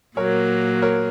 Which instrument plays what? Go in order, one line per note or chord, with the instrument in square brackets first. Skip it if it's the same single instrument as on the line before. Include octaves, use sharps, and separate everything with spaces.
[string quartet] A#2 F#3 A#3 [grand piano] A#4 C#5
[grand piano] A#4 C#5